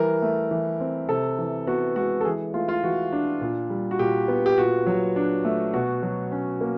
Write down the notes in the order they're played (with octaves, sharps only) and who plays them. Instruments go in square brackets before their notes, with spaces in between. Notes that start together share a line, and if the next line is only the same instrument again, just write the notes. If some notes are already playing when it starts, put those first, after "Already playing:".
Already playing: [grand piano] E3 G3 A#4
A3
E3
C4
C3 A4
E3
B3 F#4
G#3 F#4
A4
E3 G#4
A3 F4
F4
E3 F#4
D4
A#2
G3
F#4
A#2 G4
B3
G4
A#2 F#4
F#3
D4
A3
B2 F#4
F#3
C#4
A#3